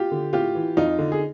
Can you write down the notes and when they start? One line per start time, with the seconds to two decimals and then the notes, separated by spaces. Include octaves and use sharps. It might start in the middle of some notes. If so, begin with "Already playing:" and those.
Already playing: F4 G4
0.12 D3
0.33 A2 F4 G4
0.55 E3
0.77 F2 D#4 F4
0.99 D3
1.12 G#4